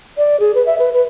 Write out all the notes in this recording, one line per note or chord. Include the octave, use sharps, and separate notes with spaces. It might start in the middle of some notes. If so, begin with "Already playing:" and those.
D5
G#4
B4
E5
B4
B4